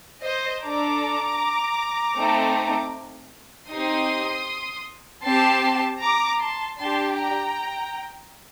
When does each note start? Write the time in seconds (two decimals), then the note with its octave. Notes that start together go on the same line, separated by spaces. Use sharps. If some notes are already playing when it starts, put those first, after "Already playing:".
0.24 C5 D#5
0.63 D4 A4 A#5 D6
2.17 A3 C4 D#4
3.71 C4 D#4 G4 C6 D#6
5.25 C4 G4 A5 C6
6.01 A#5 D6
6.40 A5 C6
6.78 D4 G4 A5 C6
7.17 G5 A#5